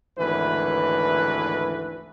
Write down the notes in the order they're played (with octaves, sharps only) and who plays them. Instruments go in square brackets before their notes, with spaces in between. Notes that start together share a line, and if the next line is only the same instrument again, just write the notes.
[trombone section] G#1 D2 E3 B4